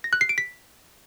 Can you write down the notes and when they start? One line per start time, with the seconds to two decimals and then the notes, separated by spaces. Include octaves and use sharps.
0.04 A#6
0.13 F#6
0.21 C7
0.29 D7
0.38 B6